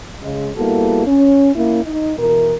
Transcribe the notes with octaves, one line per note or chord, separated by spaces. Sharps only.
C#3 G#3
G3 A#3 B3 E4 F#4 A4
C#4
A#3 C#4 E4
D#4
B2 E3 E4 A#4